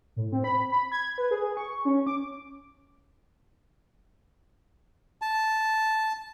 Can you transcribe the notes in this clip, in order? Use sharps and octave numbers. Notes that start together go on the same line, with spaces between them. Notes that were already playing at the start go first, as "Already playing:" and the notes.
A2
C4
B5
B5
G#6
B4
G#4
C#6
C#4
D6
A5